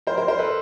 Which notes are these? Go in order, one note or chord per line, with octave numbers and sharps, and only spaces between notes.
A#4 C5
A#4 C5
A#4 C5
A4 B4